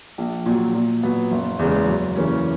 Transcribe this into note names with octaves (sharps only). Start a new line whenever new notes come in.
A#1
A#2 F#3
A#2
F#3 B3
F#1
E2 C#3 G#3
F#2
C#3 E3 A#3 C#4